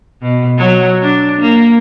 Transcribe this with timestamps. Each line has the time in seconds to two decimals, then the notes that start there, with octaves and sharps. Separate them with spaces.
0.22 B2
0.57 F#3
1.02 D4
1.41 A#3